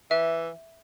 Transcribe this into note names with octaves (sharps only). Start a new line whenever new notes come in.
E3 E5